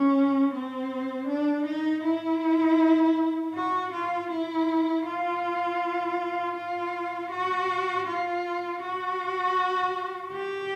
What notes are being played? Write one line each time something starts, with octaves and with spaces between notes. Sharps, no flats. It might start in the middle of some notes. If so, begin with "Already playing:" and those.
Already playing: C#4
C4
D4
D#4
E4
F#4
F4
E4
F4
F4
F#4
F4
F#4
G4